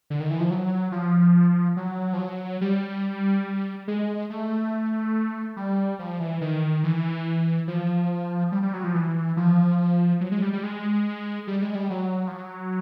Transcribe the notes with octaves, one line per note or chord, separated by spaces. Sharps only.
D3
D#3
E3
F3
F#3
F3
F#3
F3
F#3
G3
G#3
A3
G3
F3
E3
D#3
E3
F3
G3
G3
F#3
F3
E3
F3
F#3
G#3
G3
G3
G#3
G3
G#3
G3
F#3
F3
F#3